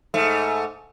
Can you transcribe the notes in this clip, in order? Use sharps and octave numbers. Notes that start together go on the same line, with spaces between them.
G#2 A3